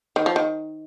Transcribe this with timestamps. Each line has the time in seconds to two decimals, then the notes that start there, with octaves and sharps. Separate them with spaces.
0.16 D#3
0.26 F3
0.36 D#3